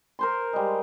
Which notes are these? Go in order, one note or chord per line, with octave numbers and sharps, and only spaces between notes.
A#4 C5 C6
G3 G#3